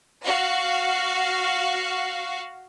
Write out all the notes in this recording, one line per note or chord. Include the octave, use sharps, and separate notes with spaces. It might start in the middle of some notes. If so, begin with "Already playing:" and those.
F#4 F5